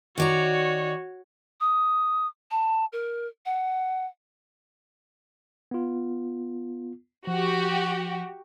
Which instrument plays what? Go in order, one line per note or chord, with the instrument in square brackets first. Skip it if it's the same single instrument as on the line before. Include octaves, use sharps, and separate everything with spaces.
[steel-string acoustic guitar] D#3 D5 A#5 [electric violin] F#4 C#5
[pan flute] D#6
A5
A#4
F#5
[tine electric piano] B3 F4
[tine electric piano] F3 [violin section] F#4 G4